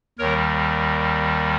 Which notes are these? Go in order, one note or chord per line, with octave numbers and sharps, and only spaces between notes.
D#2 D#3 G3 A#4 C#5